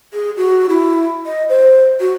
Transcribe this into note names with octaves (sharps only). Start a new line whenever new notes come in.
G#4
F#4
E4
D#5
C5
F#4